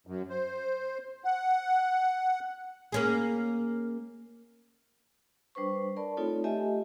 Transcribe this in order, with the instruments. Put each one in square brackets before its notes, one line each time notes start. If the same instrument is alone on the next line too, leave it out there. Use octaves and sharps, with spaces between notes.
[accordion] F#2
C5
F#5
[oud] A#3 C#4 G#4
[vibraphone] G3 D4 B4 C5 C#6
A#4 D5 A5 B5
A3 C4 D#4 F4 A4 C#5
A3 G4 D#5 E5 G#5